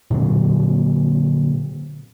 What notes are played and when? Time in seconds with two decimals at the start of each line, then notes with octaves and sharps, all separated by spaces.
0.10 A#2 D3 F#3 C4